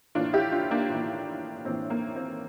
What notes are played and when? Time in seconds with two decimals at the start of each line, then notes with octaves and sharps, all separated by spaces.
0.15 A2 E3 A#3 D4 F4
0.33 E4 G4
0.52 D4 F4
0.71 A#3 D4
0.90 A2 E3 A#3
1.65 A2 E3 A#3 C4
1.90 A#3
2.16 C4